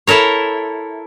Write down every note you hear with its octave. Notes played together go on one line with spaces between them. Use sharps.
E4 A4 A#4 C#5